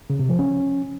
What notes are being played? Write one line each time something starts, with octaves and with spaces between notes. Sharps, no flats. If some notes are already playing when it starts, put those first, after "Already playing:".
C#3
C3
F3
C#4